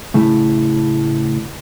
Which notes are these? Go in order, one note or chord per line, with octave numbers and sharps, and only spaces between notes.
A2 C#3 A3 E4